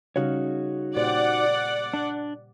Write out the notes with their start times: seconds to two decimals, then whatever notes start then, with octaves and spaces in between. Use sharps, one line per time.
0.16 C#3 G3 D#4 F#4 C#5 F5
0.96 A#2 G4 C5 D5 F#5
1.94 D4